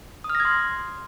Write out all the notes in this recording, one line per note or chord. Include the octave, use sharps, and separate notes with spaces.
D#6
F6
A#6
G#6
C6